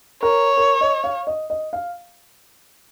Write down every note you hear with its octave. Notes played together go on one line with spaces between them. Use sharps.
A#4 C#5
A#4
D#5
F5
D#5
D#5
F5